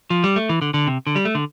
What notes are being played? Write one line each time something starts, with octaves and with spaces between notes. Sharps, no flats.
F3
G3
A3
E3
D3
D3
C3
D3
G3
A3
D3